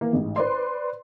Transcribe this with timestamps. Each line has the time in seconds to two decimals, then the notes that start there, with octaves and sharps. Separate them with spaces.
0.01 E3 A#3
0.13 A1 G#2
0.36 B4 C5 D5 C6